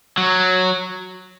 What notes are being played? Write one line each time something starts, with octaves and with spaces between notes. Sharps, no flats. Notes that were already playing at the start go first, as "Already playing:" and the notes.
F#3